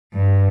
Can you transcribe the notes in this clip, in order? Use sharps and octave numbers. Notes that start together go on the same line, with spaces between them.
G2